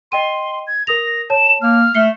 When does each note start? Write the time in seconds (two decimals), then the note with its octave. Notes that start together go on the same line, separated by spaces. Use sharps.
0.12 D#5 G5 C6 D#7
0.67 G#6
0.87 A#4 D#6 A#6 F7
1.30 C#5 A5 E7
1.62 A#3 F6
1.95 A3 C7 C#7 G7